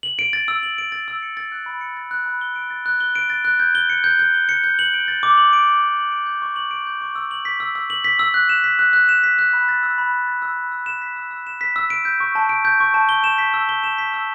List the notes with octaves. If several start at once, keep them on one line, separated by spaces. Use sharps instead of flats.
F#7
D7
A6
E6
F#7
D7
A6
E6
C#7
A6
F#6
B5
C#7
A6
F#6
B5
G7
D7
A6
F#6
G7
D7
A6
F#6
G6
G7
C#7
G6
G6
G7
C#7
G6
F#7
D7
A6
D6
F#7
D7
A6
D6
F#7
D7
G6
C#6
F#7
D7
G6
C#6
E6
F#7
B6
E6
E6
F#7
B6
E6
F#6
E7
B6
F#6
F#6
E7
B6
F#6
B5
A6
E6
B5
B5
A6
E6
B5
E6
E7
B6
E6
E6
E7
B6
E6
D7
G6
C#6
A5
D7
G6
C#6
A5
G7
E7
B6
E6
G7
E7
B6
E6